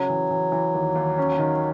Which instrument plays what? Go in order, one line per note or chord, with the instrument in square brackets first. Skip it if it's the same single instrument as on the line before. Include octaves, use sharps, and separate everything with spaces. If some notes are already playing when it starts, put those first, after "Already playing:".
Already playing: [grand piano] C#3 [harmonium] F#3
[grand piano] E3
E3
E3
D#2
D#2
C#4
D#3